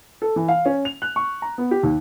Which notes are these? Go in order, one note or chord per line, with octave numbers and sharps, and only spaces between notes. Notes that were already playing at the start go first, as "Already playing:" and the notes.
A4
E3
F5
C#4
F7
F#6
C#6
A#5
B3
G4
D#2